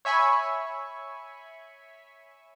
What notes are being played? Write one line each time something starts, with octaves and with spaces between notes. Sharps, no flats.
C#5 E5 G#5 B5 C#6